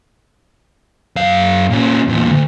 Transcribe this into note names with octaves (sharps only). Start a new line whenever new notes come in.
F#2 F5
A#2 C#4
E2 A#2
D2